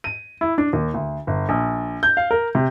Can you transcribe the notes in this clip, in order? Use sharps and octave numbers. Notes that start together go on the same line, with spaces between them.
D#7
E4
D4
D#2
D2
G1
A#1
G6
F5
A#4
C3